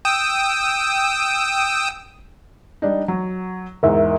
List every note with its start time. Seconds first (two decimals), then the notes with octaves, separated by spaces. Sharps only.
0.05 G5 D#6 E6
2.82 G3 D4 D#4
3.08 F#3
3.83 E2 G#2 A#4 E5